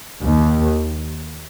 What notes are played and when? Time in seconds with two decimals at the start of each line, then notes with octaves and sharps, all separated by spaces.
0.21 D#2